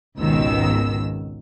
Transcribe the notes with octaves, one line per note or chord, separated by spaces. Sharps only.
G#1 C#2 B2 D#3 E6